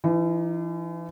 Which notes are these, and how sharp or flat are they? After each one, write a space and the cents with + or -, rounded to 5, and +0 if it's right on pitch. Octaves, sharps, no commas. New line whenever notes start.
E3 +35 D#4 +0